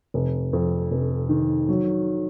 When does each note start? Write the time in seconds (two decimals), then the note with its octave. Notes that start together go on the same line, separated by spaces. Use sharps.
0.14 F1
0.53 F2
0.91 F1
1.29 D#3
1.69 F#3